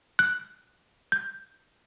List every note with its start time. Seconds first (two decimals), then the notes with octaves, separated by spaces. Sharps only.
0.19 F#6
1.12 G6